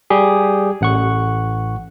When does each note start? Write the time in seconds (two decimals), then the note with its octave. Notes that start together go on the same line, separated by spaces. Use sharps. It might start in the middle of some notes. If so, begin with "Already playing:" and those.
0.10 G3 G4 G#4
0.81 A1 F#5 C#6